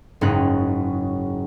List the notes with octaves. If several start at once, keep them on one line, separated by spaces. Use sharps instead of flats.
F#1 G#2 C#4 D#4 F#6